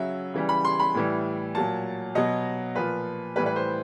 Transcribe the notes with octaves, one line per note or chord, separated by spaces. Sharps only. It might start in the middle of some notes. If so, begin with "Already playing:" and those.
Already playing: C#3 F#3 E5
C#3 E3 G3
B5
C6
B5
A2 E3 G3
A#2 F#3 A5
B2 F#3 D#5
A#2 F3 B4
A2 E3 G3 B4
B4
C5